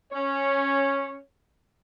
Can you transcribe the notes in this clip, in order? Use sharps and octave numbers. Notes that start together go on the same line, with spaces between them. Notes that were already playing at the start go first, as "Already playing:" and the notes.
C#4 C#5